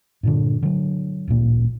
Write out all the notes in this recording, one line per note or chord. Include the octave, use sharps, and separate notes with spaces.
G2 A#2 D3
D3 F#3
D1 A1 A#2 A#3